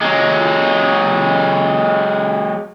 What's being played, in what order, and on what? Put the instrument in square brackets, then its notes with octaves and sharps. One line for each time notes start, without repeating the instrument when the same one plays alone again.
[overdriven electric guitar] F#3 G#3